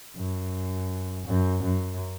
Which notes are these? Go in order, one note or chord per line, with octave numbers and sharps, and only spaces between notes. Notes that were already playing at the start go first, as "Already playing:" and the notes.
F#2
F#2
F#2